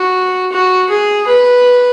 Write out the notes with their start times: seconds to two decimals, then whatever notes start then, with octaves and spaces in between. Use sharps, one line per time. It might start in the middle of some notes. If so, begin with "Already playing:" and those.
Already playing: F#4
0.52 F#4
0.90 G#4
1.27 B4